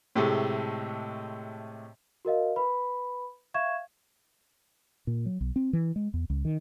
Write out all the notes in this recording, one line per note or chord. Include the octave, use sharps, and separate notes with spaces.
A2 C3 G#3 A3
F#4 A#4 D#5 F5
B4 B5
E5 F5 C#6 G#6 E7
A#2
F#3
B1
C4
E3
G#3
E2
C#2
D#3